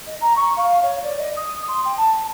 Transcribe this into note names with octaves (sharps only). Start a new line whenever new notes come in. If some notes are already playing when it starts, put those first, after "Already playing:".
D#5
A#5
C#6
F5
C#5
D5
D#5
D#6
C6
G5
A5